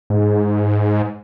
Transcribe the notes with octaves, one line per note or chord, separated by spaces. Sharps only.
G#2